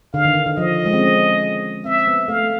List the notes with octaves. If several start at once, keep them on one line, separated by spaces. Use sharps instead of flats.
D3 F5
D#3
D3
D#3
F3 D#5
G#3
C4
C#4
C4 E5
B3
A3 F5